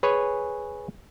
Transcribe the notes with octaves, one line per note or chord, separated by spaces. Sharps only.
G#4 B4 C#5 G#5